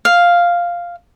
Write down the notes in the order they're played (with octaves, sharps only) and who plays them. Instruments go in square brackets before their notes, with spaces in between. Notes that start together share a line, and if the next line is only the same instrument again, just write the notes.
[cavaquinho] F5